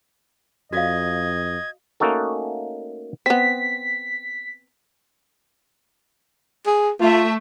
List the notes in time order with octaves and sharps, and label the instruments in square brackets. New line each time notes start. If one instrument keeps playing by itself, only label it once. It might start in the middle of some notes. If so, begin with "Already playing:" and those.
[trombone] F2 [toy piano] F#4 D5 F5 [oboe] D#5 [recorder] G#6
[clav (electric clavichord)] A3 A#3 C#4 D#4 F#4 A4
[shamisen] B3 C4 [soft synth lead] B6
[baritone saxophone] G#4
[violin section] A3 E5 [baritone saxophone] F4